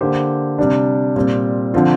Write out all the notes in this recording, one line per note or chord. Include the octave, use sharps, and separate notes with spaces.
D3 A#3 G4 C5
C3 G3 D4
A#2 G3 C4
D3 F3 C4 F4